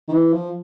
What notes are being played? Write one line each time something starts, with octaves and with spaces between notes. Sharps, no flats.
D#3
E3
F3